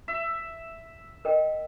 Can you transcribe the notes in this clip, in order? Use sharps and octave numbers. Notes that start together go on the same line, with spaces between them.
E5
A#4 D#5 G5